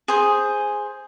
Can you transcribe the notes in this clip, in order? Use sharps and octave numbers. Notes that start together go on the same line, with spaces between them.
G#4 C5